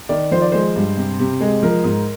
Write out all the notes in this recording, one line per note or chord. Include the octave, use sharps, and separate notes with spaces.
D#3 D5
F3 C5
D5
G#3 C5
G2
C3
C3
G#3
F3 A#4
G#2